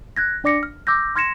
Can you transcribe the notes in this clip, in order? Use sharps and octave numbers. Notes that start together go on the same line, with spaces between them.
F#6 G#6 A#6
D4 D5 D6 A#6 C#7
F6
D6 E6 G6 A#6
C6 F6 G#6 A#6 C#7 E7